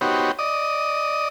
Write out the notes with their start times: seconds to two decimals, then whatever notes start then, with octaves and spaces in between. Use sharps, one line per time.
0.01 B3 D#4 F#4 G4 C5 C#5
0.39 D5 D#5 D#6